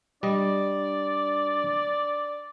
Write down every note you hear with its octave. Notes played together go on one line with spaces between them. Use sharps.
G3 D4 D5 D#5